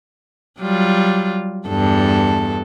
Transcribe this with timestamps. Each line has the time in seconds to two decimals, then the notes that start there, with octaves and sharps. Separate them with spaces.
0.60 F#3 G3 F4
1.68 E2 G2 A4